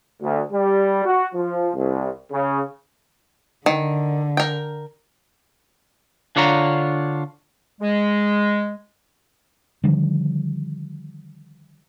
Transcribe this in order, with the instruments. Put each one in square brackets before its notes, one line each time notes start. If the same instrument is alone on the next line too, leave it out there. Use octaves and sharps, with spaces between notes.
[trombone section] D2
G3
F#4
F3
C2
C#3
[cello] D3 [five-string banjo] D#3
[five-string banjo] A#4 G5
[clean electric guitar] D3 D4 F4 C#5 A#5
[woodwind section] G#3
[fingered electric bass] D3 D#3 F3 G3